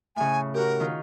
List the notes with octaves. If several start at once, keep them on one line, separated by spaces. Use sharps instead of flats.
A2 C#3 G#5
F#4 G4 A#4
D#3 D#4 F4